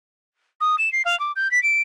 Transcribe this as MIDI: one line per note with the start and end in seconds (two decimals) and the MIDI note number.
0.60 0.76 87
0.78 0.91 100
0.92 1.02 96
1.05 1.18 77
1.20 1.32 86
1.36 1.50 91
1.51 1.61 95
1.63 1.82 98